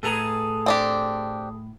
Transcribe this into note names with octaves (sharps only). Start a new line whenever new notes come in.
A2 G#4 A4 B4 A#5
C4 D4 G4